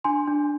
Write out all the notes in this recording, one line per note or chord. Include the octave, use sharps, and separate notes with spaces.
D4 G#5 C6
D4